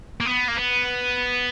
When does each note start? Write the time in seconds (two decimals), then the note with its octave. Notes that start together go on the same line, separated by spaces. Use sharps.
0.20 A#3
0.25 B3
0.48 A#3
0.57 B3